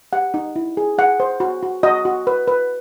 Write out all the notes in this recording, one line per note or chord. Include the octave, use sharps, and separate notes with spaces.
G4 F#5
D#4
E4
G#4
G#4 F#5
C5
F#4
F#4
F#4 D#5
F#4
B4
B4